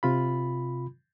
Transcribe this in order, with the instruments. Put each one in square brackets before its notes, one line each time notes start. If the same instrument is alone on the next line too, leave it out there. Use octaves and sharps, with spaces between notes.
[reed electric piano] C3 F4 B5